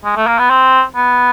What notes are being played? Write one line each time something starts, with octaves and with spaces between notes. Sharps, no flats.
G#3
A3
A#3
B3
C4
B3